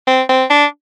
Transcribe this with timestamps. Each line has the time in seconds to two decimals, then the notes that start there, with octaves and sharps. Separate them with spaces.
0.07 C4
0.29 C4
0.50 D4